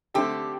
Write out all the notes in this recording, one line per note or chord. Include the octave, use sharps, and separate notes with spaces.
D3 A3 C4 G4 A4